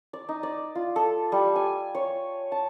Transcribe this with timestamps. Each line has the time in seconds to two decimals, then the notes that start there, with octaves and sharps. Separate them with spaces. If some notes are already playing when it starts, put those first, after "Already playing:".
0.13 D5
0.29 D#4
0.43 D5
0.75 F4
0.96 A4
1.32 G3
1.56 G#5
1.95 C#5
2.52 A5